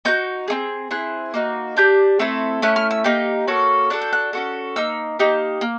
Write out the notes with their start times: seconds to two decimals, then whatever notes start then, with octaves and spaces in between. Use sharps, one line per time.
0.05 B3 D#4 F#4 G6
0.48 C4 D#4 G#4
0.91 C4 E4 G#4 F#6
1.34 A#3 D#4 F#4
1.77 D4 G4 G6
2.19 A3 C4 E4 A4
2.62 A3 C#4 E4 F#6
2.76 F6
2.91 E6
3.04 A#3 D#4 G4
3.48 A#3 C#4 F#4 A4
3.90 D4 F#4 A4 F#6
4.01 G6
4.13 F#6
4.33 C#4 F#4 A4
4.76 A#3 D#4 E6
5.19 A#3 D#4 G4
5.61 A#3